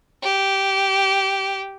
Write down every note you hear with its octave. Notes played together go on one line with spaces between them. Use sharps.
G4